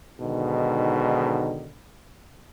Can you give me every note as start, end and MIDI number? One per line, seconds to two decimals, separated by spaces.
0.20 1.73 44
0.20 1.73 47
0.20 1.73 50
0.20 1.73 51